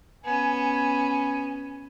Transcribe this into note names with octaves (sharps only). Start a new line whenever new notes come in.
B3 C#4 G#5